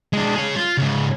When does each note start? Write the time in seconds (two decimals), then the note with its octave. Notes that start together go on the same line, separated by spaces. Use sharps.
0.13 G#3 D4
0.36 G#4 C#5
0.56 F4
0.78 G#2 C#3